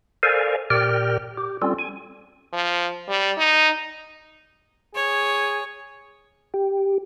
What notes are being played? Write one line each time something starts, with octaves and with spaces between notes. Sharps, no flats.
A4 A#4 C5 D5 F5 G#5
A#2 G4 A#4 D5 G5 F6
G4
G3 C4 C#4 F4 A4
G#5
F3
G3
D#4
G#4 C#5
G4